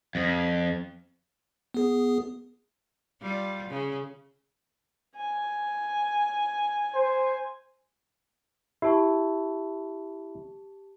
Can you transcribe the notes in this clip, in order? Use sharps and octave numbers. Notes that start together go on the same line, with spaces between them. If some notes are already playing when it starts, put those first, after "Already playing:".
F2
B3 G#4
G3 F4
C#3
G#5
C5
E4 G4 A5 C#6